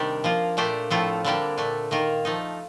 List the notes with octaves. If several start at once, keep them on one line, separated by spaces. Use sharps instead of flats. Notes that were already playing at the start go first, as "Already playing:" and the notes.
Already playing: C3 D#3 G3 D4 G4
F3 A#3 F4
A#2 A3 D4 G4 C5
A2 F3 A3 C4 F4
D3 G3 A#3 D4 G4
A#2 A3 D4
D#3 A#3 F4 A#4
F3 A3 D#4